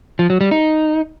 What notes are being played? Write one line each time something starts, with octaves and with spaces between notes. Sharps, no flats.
F3
F#3
G3
D#4